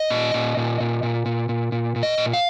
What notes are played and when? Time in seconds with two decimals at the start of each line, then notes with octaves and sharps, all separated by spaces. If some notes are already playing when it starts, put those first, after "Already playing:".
Already playing: D#5
0.10 A#2
0.34 A#2
0.57 A#2
0.80 A#2
1.03 A#2
1.26 A#2
1.49 A#2
1.72 A#2
1.96 A#2
2.03 D#5
2.18 A#2
2.33 F5